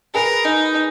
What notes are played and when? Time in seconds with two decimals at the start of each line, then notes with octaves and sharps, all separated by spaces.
0.14 G#4 A#4 B4
0.45 D#4